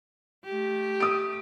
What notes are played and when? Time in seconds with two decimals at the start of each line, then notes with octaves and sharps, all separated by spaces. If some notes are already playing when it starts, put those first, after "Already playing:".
0.45 A3 G4
1.00 D#6 D7